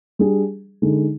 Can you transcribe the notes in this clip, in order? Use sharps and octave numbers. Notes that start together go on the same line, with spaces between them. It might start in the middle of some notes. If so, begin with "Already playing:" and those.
G3 D4 G#4
D3 G#3 D#4